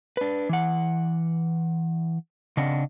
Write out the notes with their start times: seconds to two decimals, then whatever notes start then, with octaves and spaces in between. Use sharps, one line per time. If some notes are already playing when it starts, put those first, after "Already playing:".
0.17 D4 B4
0.49 E3 F#5
2.57 C#3 C4 D4 D#5 F#5